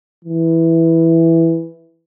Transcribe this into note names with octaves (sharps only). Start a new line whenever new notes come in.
E3